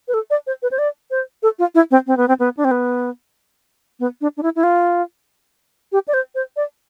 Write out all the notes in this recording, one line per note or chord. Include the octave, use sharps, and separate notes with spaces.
B4
A4
D5
C5
B4
C5
D5
C5
A4
F4
E4
C4
C4
B3
C4
B3
D4
C4
B3
B3
D4
D4
E4
E4
F4
G4
D5
C5
C5
D5